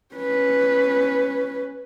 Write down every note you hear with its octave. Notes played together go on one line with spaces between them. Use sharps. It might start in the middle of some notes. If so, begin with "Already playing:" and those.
C#4 B4